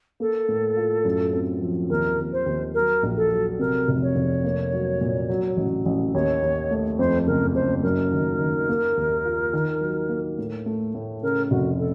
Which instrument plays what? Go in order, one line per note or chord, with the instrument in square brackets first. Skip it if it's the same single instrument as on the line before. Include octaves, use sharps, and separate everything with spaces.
[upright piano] A#3 [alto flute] A4
[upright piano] A2
F4
F#2
C4
F3
[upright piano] D#2 [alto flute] A#4
[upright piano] D#2
[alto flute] C5
[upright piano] D#2
[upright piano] F#3 [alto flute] A#4
[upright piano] A#1
[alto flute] A4
[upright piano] F#3
[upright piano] C3 [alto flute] A#4
[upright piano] F1
[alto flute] C#5
[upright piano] F1
A#3
F#3
A#2
F#3
A1
A1
[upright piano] D#2 [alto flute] C#5
[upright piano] D#2
A3
[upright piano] F2 [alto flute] C5
[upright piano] F#1 [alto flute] A#4
[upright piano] F#1 [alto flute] C5
[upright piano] F#2 [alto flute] A#4
[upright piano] D#3
D#3
A#3
D#2
F4
D#3
F#3
A#3
A2
A3
A2
[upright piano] C#3 [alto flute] A#4
[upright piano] F1 [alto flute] F#4
[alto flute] A4